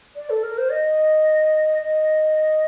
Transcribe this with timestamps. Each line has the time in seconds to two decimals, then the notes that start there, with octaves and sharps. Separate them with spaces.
0.16 D5
0.30 A4
0.43 A#4
0.58 C5
0.71 D#5
1.83 D#5